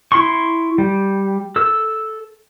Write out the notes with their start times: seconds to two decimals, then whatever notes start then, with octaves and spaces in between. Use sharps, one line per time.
0.12 E4 C6 C#6
0.78 G3
1.56 A4 E6